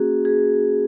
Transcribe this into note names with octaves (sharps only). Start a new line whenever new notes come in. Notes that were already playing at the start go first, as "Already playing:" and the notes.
Already playing: A#3 C#4 F#4 G#4
G#4